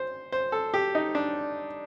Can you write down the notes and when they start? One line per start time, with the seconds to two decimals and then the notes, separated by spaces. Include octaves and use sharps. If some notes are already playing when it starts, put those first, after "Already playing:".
Already playing: C5
0.32 C5
0.52 A4
0.74 G4
0.95 D#4
1.15 D4